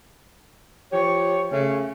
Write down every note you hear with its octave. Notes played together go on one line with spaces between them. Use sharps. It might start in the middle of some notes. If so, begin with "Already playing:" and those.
F3 G4 C#5
C#3 A3 C#4